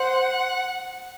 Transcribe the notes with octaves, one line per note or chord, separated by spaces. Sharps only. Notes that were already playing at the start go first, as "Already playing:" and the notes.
Already playing: C5 F#5